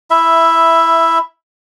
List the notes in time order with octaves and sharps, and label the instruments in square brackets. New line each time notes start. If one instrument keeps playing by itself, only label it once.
[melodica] E4 E5